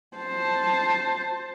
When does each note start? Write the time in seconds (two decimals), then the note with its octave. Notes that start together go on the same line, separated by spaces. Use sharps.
0.17 C5 A5